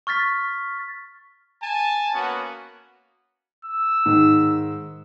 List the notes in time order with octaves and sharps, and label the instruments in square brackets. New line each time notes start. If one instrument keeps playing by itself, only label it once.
[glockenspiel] C#6 F6 A6 B6
[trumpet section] G#5 A5
A#3 B3 C#4 F#4
[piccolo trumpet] E6
[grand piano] G#2 D#3